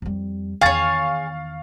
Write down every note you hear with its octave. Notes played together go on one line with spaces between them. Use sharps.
F2 G3
E2 D#3 G#4 C#5 F5 C#6 A6